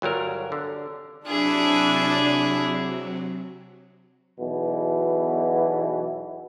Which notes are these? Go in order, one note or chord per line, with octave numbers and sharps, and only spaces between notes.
G1 F#3 G3 A#4
D3
C3 F#3 D4 E4 G#4
B1 E2 B2 E3